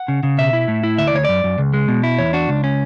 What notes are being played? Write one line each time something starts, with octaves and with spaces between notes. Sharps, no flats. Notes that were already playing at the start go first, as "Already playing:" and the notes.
Already playing: F#5
C#3
C#3
B2 E5
E4
A2
E4
D2 E5
D5
D2 C#5
F#2 D5
F#2
C#2
G#3
B2
E4
E2 C#5
D4 F#4
C#2
C#4